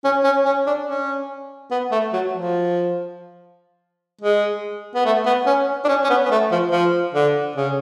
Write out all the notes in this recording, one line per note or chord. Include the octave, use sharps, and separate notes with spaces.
C#4
C#4
C#4
D4
C#4
B3
A3
F#3
F3
G#3
B3
A3
B3
C#4
D4
C#4
C#4
B3
B3
A3
F3
F3
D3
C#3